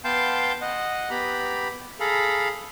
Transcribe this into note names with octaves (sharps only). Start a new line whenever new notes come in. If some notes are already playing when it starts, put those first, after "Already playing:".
B3 F5 G5 A5 C6 G6
D#5 F#5
B3 G4 A#5 B5
G#4 A4 F5 A#5 B5